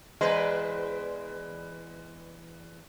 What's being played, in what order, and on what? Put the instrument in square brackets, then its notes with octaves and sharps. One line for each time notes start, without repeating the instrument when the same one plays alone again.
[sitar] E2 B4 C5 [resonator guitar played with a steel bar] G#3